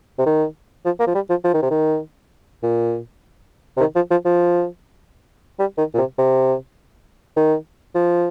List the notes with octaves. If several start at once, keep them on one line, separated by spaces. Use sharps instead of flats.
C3
D#3
F3
A#3
F3
G3
F3
F3
D#3
C3
D#3
A#2
C3
D#3
F3
F3
F3
G3
D#3
A#2
C3
C3
D#3
F3